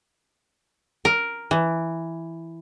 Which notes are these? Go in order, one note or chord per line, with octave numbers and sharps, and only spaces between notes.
A#4
E3